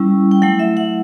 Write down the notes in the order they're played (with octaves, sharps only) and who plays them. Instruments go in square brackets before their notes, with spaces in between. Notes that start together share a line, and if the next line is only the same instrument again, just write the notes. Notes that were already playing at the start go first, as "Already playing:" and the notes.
Already playing: [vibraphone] G3 C#4 E4
G5
F#3 A3 E4 F#5
E5
F#5